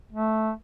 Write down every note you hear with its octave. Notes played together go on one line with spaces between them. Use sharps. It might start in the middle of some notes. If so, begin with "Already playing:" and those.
A3